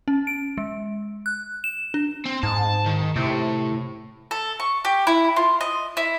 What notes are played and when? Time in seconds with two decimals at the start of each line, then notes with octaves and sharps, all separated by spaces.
0.08 C#4
0.27 D7
0.58 G#3
1.26 F#6
1.64 E7
1.94 D4
2.25 C4
2.43 G#2 A5
2.86 D#3
3.16 A2 C3
4.31 A4
4.60 C#6
4.85 G4
5.07 E4
5.36 F4
5.61 D#5
5.97 E4